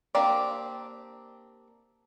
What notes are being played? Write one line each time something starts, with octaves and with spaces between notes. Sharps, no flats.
A#3 C4 D4 G4 D5